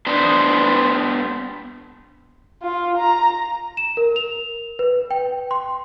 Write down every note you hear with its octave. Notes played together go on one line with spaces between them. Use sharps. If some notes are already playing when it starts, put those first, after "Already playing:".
B3 D4 C5
F4
A#5
E7
A#4
F7
B4
G5
C6